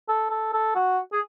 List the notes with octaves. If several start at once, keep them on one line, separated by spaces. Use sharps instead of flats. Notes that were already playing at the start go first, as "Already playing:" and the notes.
A4
A4
A4
F#4
G#4